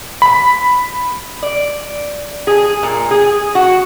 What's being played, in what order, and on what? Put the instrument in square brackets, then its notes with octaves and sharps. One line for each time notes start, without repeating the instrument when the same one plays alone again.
[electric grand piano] B5
[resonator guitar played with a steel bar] D5
G#4
A#2
G#4
F#4